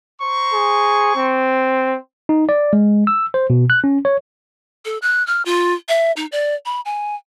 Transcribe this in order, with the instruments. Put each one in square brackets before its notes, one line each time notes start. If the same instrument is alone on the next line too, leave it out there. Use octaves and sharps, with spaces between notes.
[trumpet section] C5 A#5 C#6
[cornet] G#4
C4
[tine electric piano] D#4
D5
G#3
E6
C5
B2
F#6
C#4
C#5
[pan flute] A4
F#6
F6
F4
E5
D#4
D5
B5
G#5